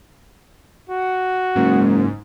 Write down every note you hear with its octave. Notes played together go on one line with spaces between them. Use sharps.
F#4
F#1 G#2